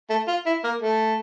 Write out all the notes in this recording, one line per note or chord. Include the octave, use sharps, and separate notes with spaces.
A3
F4
E4
A#3
A3